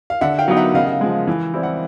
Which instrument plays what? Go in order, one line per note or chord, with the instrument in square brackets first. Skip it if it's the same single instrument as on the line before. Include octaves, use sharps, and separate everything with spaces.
[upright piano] F5
[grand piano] D3 [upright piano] E5 F#5
[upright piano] F5 G5
[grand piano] F#3 B3 D#4
[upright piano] E5 F#5
[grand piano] C#3 [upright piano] D#5 F5
[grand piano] F3 G#3
E3
G3 C4 E4
[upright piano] F#5